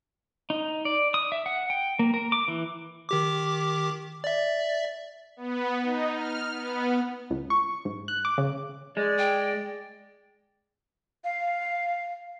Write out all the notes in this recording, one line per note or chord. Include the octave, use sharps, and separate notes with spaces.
D#4
D5
D#6
E5
F#5
G5
A#3
A#4
D6
E3
D#3 G4 D6
D5 E5
B3
D#4
F6
B3
C#2
C#6
G#2
F#6
D6
C#3
G#3 D5
G5
F5